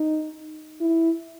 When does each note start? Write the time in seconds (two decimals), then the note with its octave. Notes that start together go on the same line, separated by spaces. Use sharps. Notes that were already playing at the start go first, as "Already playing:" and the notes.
Already playing: D#4
0.81 E4